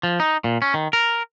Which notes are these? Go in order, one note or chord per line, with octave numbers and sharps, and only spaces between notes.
F3
D#4
A#2
C#4
D#3
A#4